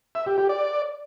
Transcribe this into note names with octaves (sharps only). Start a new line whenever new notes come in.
E5
G4
G4
D5